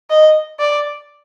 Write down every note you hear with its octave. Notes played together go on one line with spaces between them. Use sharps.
D#5
D5